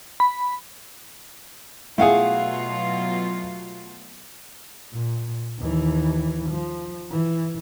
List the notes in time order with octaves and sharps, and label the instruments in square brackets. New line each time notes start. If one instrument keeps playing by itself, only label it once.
[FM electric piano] B5
[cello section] B2 F#3 F4 [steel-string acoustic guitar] A3 F5 F#5 [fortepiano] E4 G#4
[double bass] A#2
D#2 E3
F3
E3